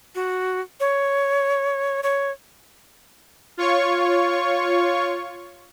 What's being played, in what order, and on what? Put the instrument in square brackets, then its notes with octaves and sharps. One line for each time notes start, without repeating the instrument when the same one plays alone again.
[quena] F#4
C#5
C#5
[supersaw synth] F4 C#5 C#6